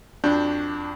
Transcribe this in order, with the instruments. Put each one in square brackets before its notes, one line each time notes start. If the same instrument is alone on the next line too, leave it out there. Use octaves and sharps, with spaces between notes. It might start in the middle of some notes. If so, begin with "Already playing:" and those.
[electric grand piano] F2 D4 F#4 G6